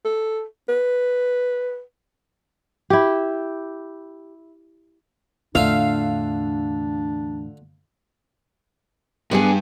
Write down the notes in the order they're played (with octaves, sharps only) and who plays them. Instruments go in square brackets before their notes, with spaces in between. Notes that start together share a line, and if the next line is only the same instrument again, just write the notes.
[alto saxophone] A4
B4
[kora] E4 G4
[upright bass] E2 A2 [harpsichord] D3 F4 E5 [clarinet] D4 [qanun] F5
[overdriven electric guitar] G2 [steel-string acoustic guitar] B3 D4 G#4